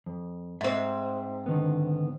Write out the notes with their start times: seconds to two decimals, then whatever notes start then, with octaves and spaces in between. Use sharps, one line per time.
0.06 F2
0.61 G#2 C4 E5
1.46 D3 D#3 B3